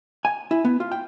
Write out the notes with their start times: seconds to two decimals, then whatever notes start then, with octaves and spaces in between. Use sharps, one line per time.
0.25 G#5
0.51 E4
0.65 B3
0.80 F4
0.92 G5